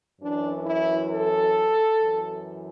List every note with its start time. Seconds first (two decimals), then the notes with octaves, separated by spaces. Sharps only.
0.21 F#2 E3 D4
0.66 E4
1.11 A4
2.01 F#2 E3